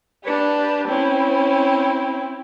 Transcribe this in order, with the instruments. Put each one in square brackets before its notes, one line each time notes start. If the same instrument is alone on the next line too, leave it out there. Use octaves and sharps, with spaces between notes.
[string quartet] D4 G4 B4
C4 C#4 E4